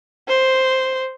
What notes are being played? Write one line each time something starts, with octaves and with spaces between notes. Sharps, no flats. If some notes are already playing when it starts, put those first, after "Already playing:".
C5